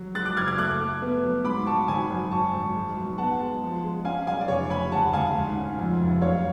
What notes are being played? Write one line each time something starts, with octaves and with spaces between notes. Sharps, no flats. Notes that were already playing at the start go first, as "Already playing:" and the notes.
Already playing: F#3
G#3 F#6 A6
D6 F#6
F#1 F6 G#6
F6 G#6
A3 D6 F#6
A3
B3
F#3
G#2 B5 D6
G#2 A5 C#6
G#1 G#5 B5
F#2
G#1 A5 C#6
G#1
G#3
B1
B3 F#5 A5
G#3
F3
G#3
C#4 F5 G#5
B1 F5 G#5
D5
F1 C#5
F1 G#5 B5
D2 F#5 A5
D2 F5 G#5
G#2
C#4
F2
F1
F#2 C#5 F5